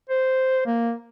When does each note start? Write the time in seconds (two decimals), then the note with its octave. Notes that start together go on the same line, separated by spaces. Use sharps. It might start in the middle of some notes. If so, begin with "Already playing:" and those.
0.10 C5
0.66 A#3